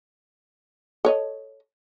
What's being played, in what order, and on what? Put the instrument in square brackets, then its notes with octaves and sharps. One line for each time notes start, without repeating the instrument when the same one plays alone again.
[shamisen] A4 C#5 D#5